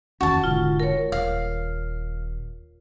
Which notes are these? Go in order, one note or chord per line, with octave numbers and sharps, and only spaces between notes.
F1 D#2 C#4 F#4 A5
E1 G#2 D3 F4
A#4 C#5
D#1 F5